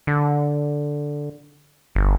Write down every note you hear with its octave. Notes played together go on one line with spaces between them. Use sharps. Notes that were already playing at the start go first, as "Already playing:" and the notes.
D3
G1